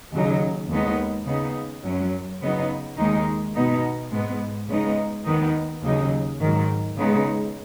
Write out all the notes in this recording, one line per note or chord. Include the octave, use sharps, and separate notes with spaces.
D#2 C#3 F#3 D#4
D#2 D#3 G#3 B3 D#4
C#3 B3 D#4
F#2 F#3 C#4
C#3 F#3 B3 D#4
D#2 D#3 G#3 D#4
B2 B3 D#4
G#2 G#3 B3
C#3 G#3 B3 D#4
D#2 D#3 B3 D#4
D#2 C#3 F#3 D#4
G#2 D#3 F#3
C#3 G#3 B3 D#4